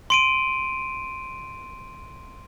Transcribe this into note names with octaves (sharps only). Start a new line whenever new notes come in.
C6 D7 D#7